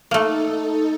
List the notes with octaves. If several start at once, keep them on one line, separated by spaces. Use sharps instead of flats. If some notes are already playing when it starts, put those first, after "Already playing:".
A3 A#3 D#4 A4